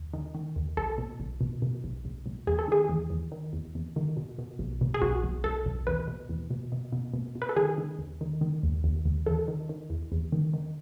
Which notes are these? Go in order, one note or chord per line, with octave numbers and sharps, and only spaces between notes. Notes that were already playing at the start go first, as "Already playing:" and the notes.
Already playing: D#2
D#3
D#3
D#2
B1 A4
B2
B1
B2
B2
B1
B1
B1
E2 G#4
A4
D#3 G#4
E2
E2
D#3
E2
E2
D#3
B2
B2
B1
B2
G#4
B1 F#4
B1
B1 A4
B1
E2 B4
B2
E2
B2
B2
B2
B2
B2
B4
A4
D#3 G#4
D#3
D#2
D#3
D#3
D#2
D#2
D#2
E2 A4
D#3
D#3
E2
E2
D#3
D#3